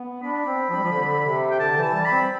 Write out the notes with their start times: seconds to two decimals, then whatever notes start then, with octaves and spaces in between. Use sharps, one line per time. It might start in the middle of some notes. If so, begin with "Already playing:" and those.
Already playing: B3
0.23 D4 B5
0.46 C4
0.69 F3
0.76 G3
0.83 F3
0.92 D3
1.26 C3
1.51 G5
1.60 D3 A5
1.77 E3
1.83 A5
1.94 G3
2.05 B5
2.12 C4